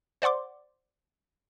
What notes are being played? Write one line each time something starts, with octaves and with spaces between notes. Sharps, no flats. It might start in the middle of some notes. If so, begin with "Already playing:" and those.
C5 D5 F#5 C6 D6